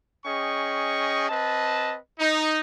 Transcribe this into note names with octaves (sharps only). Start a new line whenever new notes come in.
C#4 G#4 D#5 G5 C#6
C4 B4 D#5 A5
D#4